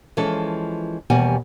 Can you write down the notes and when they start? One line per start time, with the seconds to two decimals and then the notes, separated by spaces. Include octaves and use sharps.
0.17 E3 F3 G#3 C#4 A4
1.10 D#2 B2 E3 G3 F#5 G#5